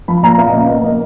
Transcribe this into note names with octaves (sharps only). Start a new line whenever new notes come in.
F3 B5
A#2 A#5
B3 F5
D#5
C#3 F5
A#3
A#3 D#5